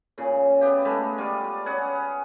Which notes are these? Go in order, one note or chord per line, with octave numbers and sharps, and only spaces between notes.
A#2 C#3
B3 G4
G#3 A3 B5
G3 F4 D5
C#4 G#4 F#5